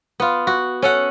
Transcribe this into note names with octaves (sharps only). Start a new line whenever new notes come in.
B3 F4
F#4
C#4 A4 F#5